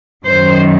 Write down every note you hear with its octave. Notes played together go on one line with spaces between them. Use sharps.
F#2 D#3 C5